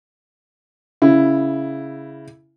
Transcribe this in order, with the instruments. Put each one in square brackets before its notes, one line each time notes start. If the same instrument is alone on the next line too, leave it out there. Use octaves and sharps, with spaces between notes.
[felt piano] C#3 E4